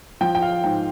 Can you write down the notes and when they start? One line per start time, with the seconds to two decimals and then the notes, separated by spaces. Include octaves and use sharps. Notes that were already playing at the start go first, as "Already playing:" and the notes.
0.21 F3 G5
0.35 G5
0.42 F5
0.64 G#2 G5